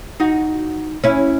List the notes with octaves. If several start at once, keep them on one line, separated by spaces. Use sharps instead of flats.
D#4 F#4
C#4 E4